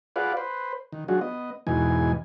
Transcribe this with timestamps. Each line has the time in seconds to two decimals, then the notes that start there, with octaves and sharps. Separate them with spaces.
0.16 F4 G#4 B4 D5 F5 F#5
0.37 B4 C5
0.92 D#3
1.08 F#3 D4 F4 F#4 G#4
1.21 B3 D#5
1.67 E2 G#2 B2 E3 D#4 G#5